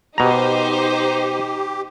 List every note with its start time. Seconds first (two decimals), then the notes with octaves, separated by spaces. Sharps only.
0.18 B2 D#4 G4 C5 A#5